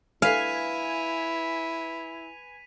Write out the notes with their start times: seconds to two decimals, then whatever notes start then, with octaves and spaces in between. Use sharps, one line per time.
0.22 E4 B4 F5 G#5 B6 D#7 F7